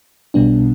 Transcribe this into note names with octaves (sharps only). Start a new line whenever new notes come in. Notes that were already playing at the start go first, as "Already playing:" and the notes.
B1 B2 G3 B3 D4